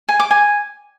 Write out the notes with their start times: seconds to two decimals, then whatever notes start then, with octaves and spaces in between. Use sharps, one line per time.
0.09 G#5
0.20 D6
0.31 G#5